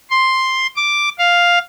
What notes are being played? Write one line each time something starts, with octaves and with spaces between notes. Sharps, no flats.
C6
D6
F5